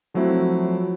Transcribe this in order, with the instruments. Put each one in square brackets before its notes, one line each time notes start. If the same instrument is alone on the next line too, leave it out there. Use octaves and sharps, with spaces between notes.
[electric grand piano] F3 F#3 A3 C4 E4 F#4